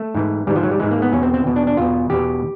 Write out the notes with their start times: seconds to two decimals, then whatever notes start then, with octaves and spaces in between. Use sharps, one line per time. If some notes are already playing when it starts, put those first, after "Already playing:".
Already playing: A3
0.15 G#2 E3
0.47 G#2 E3 G3
0.56 F3
0.63 F#3
0.71 G3
0.80 G#2 E3 G#3
0.91 A#3
1.02 B3
1.12 E2 B2 C#4
1.23 C4
1.34 C4
1.45 E2 B2
1.56 D4
1.67 D4
1.77 E2 B2 F4
2.10 E2 B2 G4